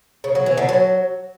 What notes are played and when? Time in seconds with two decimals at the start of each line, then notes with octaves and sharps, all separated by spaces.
0.24 C#3
0.35 F#3
0.46 E3
0.57 D3
0.69 F#3